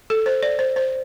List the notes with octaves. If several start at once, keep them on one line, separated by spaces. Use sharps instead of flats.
A4
C5
D5
C5
C5